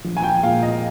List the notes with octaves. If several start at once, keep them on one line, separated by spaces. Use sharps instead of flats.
A#1
G#5
G5
A#2 G#3 F5
D#5